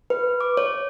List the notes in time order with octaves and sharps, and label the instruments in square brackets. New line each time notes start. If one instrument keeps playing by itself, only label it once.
[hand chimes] B4
D6
C#5